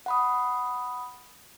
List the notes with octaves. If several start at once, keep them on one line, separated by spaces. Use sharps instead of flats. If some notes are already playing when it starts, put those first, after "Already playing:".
F#5 B5 D#6